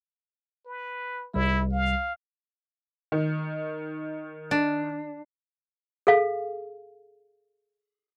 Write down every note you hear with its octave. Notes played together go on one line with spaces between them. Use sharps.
B4
C2 G3 E4
F5
D#3
D4
G#4 A4 F5